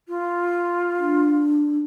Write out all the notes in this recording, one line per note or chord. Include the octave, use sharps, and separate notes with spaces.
F4
D4